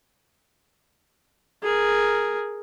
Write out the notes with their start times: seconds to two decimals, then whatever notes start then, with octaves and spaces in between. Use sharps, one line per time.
1.63 G#4 A#4